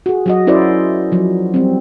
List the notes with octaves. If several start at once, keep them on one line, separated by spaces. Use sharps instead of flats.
F#4 G#4
F#3 F#4 D#5
C#4 E4 A#4 C5 D5
F3 F#3
G3 C4